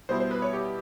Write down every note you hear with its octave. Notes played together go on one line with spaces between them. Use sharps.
B2 G3 B3 E4 C5
C5
B4
C#5
G4